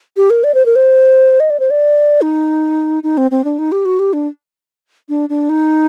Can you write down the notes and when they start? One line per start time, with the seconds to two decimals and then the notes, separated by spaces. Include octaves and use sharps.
0.17 G4
0.30 A#4
0.44 D5
0.54 C5
0.66 A#4
0.76 C5
1.40 D#5
1.50 D5
1.60 C5
1.70 D5
2.22 D#4
3.03 D#4
3.17 C4
3.31 C4
3.44 D4
3.59 D#4
3.72 G4
3.85 F#4
3.99 G4
4.13 D4
5.09 D4
5.29 D4
5.49 D#4